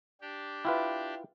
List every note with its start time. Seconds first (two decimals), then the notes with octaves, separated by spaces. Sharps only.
0.21 D4 G4
0.65 E4 F4 B4 E5 G5